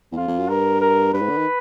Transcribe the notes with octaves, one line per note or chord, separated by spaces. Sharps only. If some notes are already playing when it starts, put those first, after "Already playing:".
E2
F2 F4
F2
F#2
G2 A#4
A#4
G2 B4
G#2
D3
D#3